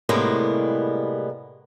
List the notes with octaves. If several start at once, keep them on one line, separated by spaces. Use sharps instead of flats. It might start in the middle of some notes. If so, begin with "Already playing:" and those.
A2 C3 G3 G#3 A#3 B3